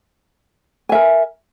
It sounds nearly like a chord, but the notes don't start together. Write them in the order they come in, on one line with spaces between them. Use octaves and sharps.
G#5 E5 A#4